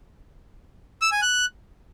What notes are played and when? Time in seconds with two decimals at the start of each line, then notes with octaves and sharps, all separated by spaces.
1.02 E6
1.12 G#5
1.22 F#6